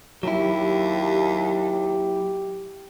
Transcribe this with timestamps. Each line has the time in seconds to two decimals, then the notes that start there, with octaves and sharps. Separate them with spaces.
0.23 D#2 F#3 E4 G4